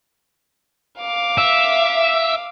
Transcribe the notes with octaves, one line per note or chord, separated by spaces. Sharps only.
F5 D6
E5